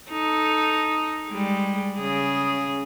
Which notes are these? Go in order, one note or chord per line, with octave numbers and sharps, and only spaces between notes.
D#4 A4
G3 G#3
C#3 G#4